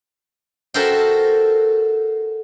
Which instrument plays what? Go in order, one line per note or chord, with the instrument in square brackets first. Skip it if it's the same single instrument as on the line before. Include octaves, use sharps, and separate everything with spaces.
[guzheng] F#4 A4 A#4 C5 E5 G5